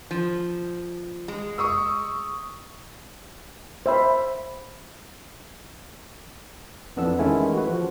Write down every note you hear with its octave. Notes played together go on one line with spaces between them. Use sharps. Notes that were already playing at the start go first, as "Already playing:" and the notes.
F3
G#3
C#6 D#6 E6
C5 E5 B5
F2 E3 B3 D4 A5 E6
D#3 E3 G#3 A3 C#4 E4
F#4 B4
F3